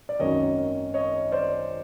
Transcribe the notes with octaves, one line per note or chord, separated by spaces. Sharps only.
D5
G#1 F#2 D#3 C#5 D#5
C#5 D#5
C5 D5